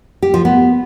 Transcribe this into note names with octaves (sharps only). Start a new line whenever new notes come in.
G4
F3
B3